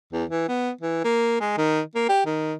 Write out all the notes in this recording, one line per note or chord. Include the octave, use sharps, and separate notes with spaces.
E2
E3
B3
E3
A#3
G#3
D#3
A#3
G4
D#3